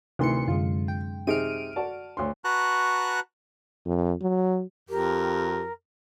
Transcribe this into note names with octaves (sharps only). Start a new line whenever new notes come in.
D2 C3 D#3 E3 C6 C#7
F#2 D3 G#3 F4
G5
C3 D#4 G#4 F6 D7 D#7
F#4 D5 A5
D2 C#5 C6
F#4 B4 A5 A#5 C#6 F#6
F2
F#3
F2 G4 A#4